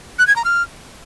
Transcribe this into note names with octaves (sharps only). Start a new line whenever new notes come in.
F#6
G#6
A#5
F6